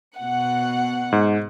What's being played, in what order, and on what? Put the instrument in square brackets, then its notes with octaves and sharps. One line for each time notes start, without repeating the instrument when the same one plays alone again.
[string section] B2 F#5
[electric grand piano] G#2